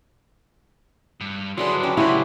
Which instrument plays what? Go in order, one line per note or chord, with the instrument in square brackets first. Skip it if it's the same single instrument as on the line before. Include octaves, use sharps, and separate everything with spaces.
[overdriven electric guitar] G2
[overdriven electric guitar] D3 E4 [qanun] F#3 D4 B4 [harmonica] G#4 C6
[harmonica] F#3 G4 [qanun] C#4 A5
[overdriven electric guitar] C#3 F#3 [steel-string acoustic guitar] E4 [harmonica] F#4 B5 C6 [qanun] G4 B4